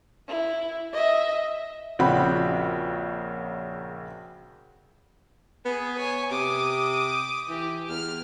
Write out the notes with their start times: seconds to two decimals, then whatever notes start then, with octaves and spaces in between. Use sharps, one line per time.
0.27 E4
0.93 D#5 E5
1.99 A#1 C#3 C4 F#4 B5
5.65 B3 G#4
5.98 C#5 G#5
6.31 C3 D6 D#6
7.49 E3 G4
7.89 E2 F6